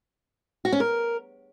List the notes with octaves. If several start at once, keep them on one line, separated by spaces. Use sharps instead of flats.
F#4
C#4
A#4